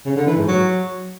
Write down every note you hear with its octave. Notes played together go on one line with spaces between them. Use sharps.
C#3
D3
E3
G#2
F#3